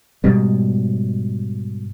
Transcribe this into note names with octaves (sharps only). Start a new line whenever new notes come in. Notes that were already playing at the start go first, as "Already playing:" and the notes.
G#2 B2 G3